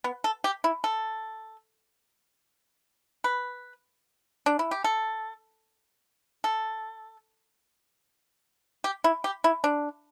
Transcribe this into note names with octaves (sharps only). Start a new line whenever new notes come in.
B3
A4
G4
E4
A4
B4
D4
E4
G4
A4
A4
G4
E4
G4
E4
D4